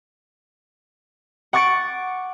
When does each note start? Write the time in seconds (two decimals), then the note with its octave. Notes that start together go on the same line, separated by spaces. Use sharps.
1.53 F#5 C#6 D6 A6 C#7 D7